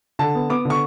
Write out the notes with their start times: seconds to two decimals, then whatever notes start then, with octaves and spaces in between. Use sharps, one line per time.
0.19 D3 A5
0.35 B3
0.50 B3 D6
0.65 D3 C#6